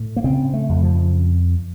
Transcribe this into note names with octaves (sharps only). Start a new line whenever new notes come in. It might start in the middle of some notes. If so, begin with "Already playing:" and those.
Already playing: A2
A#3
C#3 C4
A3
F2
F3